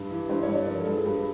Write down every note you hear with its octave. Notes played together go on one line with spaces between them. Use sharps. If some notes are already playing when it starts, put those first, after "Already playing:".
Already playing: G2
E3
G2 C5
C#5
G2
D5
F3 A#4
A4
G2
G#4
G2